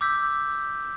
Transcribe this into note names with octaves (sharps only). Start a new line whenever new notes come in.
D6 E6 G6 B6